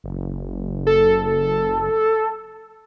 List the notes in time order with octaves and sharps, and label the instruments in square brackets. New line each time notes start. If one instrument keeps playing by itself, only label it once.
[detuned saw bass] F#1
[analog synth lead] A4